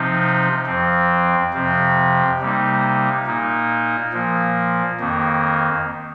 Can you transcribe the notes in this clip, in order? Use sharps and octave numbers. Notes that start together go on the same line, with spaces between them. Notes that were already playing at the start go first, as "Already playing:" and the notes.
Already playing: C3 F3 C4 D#4
F2 F3 C4
F2 C3 F3 C4
C3 G3 A#3 D#4
A#2 A#3 D#4
A#2 F3 A#3
F2 D#3 A#3